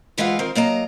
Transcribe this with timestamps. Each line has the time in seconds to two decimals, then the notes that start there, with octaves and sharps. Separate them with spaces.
0.18 D2 E3 G#3 F4 F5 F#5
0.39 D#3 C4 A#4
0.55 F#3 A#3 D#5 A#5